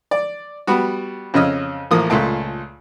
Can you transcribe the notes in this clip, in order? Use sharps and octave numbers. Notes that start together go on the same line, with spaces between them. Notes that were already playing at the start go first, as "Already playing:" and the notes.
D5
G3 B3 F#4
F2 C#3 C#4 D#5 E6 F6
A1 F3 A#3 D#6
C#2 A#2 A3 A5